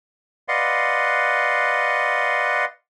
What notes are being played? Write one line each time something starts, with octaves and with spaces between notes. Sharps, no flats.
B4 D5 D#5 F5 F#5 C6